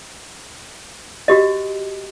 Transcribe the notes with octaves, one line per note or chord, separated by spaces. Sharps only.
F#4 G4 D#5